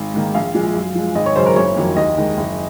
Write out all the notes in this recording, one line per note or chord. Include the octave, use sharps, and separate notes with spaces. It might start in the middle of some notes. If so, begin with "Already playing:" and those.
Already playing: G#1 F5
G#2 D#3 A#3
A#1 F5
A#2 F3 G#3
F#2
F3 G#3
G#1 D#5
C#5
F#2 C#3 C5
A#4
F#1 C#5
F2 D#3 F#3 A#3
D#2 D#5
D#3 G#3
F#1